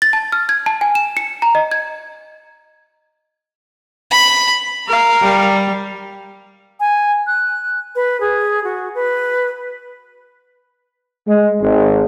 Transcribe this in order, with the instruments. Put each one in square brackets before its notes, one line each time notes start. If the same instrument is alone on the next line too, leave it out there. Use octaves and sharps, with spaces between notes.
[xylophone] A6
A5
F6
G#6
A5
G#5
E7
C#7
A#5
D#5
G#6
[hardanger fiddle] B5
[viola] A#4 F5
[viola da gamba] G3
[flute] G#5
F#6
B4
G#4
F#4
B4
[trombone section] G#3
G#1 G#3